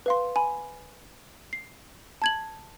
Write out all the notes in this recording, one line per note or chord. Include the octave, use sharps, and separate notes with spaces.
B4 F5 C6
G#5 B5
C7
A5 G#6 F#7